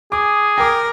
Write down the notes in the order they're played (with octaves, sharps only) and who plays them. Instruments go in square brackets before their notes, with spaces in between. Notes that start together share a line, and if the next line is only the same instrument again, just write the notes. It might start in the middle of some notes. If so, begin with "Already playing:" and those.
[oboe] G#4 [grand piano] D6
[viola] A#4 [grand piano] G5 D6